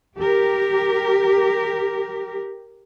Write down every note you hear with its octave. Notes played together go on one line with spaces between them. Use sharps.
G4 A#4